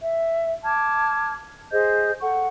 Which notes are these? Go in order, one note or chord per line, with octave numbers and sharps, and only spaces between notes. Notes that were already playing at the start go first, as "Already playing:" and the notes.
E5
A5 D6 F6 G#6
G#4 C5 D#5 G6
A4 F#5 C#6